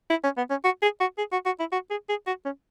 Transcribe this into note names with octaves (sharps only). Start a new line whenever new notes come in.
E4
C#4
B3
C#4
F#4
G#4
F#4
G#4
F#4
F#4
E4
F#4
G#4
G#4
F#4
C#4